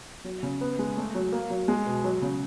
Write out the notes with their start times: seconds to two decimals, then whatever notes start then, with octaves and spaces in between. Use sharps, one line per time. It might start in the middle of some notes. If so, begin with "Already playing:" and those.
0.24 F#3
0.43 C#3
0.61 B3
0.79 G#3
0.97 A3
1.15 F#3
1.32 A#3
1.50 F#3
1.68 G#3
1.86 B2
2.04 F#3
2.22 C#3